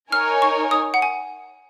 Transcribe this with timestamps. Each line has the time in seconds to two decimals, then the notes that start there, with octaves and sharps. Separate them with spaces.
0.12 D#4 A#4 C#5 G#5 F6
0.42 C#6
0.71 D#6
0.94 F#5
1.02 G#5